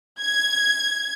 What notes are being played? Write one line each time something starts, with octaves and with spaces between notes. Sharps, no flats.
G#6